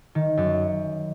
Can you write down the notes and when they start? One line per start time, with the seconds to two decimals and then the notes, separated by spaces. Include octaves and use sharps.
0.15 D#3
0.37 F#2